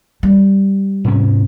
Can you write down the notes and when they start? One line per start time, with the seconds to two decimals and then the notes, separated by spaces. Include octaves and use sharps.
0.23 G3
1.05 G#2 C3 C#4